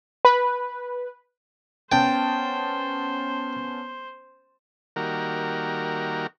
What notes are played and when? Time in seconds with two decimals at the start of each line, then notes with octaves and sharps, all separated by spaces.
0.25 B4
1.92 B3 C#4 C5 G5 A5
4.96 D#3 G3 A#3 F#4 A#4